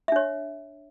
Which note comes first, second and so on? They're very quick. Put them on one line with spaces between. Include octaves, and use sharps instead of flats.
E5 D4 C#5